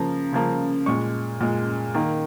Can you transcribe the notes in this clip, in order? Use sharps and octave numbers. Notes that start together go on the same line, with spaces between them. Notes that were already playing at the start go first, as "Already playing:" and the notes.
Already playing: C#3 F3 A#3 A#5
C#3 F3 A#3
A#2 G#3 C#6
A#2 G#3
D#3 A#3